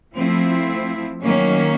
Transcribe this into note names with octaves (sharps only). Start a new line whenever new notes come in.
F3 A3 C4 E4
D#3 F#3 A#3 C#4